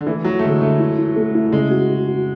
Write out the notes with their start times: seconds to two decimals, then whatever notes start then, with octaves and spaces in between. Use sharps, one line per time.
0.01 D3
0.06 E3 A3
0.24 F#3 E4
0.39 A3
0.43 D3 G#3
0.61 D3 A3
0.79 E4
0.98 E4
1.16 A3
1.35 E4
1.52 C#3 G#3
1.71 F#4
1.89 F#4
2.07 F#4